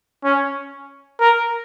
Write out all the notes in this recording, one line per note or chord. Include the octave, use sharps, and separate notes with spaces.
C#4
A#4